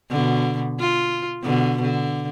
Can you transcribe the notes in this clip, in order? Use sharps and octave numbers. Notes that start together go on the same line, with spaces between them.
B2 D3
F4
B2 D3
D3